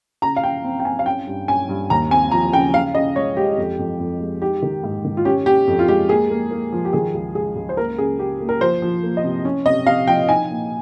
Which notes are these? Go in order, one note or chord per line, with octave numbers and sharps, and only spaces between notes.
C#3 A#5
F5
C#3 G5
C4
G5
C4 G#5
F5
C#4 G5
G2
C#4 G#5
G2
D#2 A#5
C4 G#5
F3 A#5
C#3 G5
C#3 F5
C#3 D#5
G#3 C#5
G#3 G4
F2
F2
F2
G#3
D#4 G4
D#3
G#2
D#3
F4
C#4 G4
C#4 G4
F2
F4
G#3 G4
A#3 G#4
A#3
A#3
F3
G4
D#3 G#4
C#2
C#2 G#4
C#2
C5
A#3 A#4
C#3 G#4
C#3 G4
A#3
A#4
F3 C5
F3
A#3
D#5
C3
C#4
C3 D#5
C3 F5
F3 G5
D#4 G#5
A#2